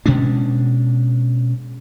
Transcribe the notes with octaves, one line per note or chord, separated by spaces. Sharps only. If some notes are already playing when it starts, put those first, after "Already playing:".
B2 G#3 C#4 D4